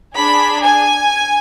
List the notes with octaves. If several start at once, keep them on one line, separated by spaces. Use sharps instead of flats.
D4 G#4 B5
G#5